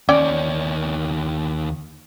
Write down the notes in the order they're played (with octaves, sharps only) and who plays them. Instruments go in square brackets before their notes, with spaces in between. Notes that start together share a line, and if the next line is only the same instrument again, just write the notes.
[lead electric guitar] D#2 C#5 [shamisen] C#4 D5 G5